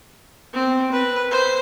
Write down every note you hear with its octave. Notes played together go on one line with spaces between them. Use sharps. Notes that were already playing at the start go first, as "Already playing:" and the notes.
C4
B4
C5